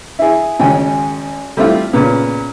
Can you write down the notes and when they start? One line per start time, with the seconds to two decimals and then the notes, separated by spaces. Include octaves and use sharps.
0.19 E4 G#4
0.60 G#1 C#3 G#3 G5 G#5
1.57 G3 A3 C4 E4 F4
1.93 A#2 C#3 B3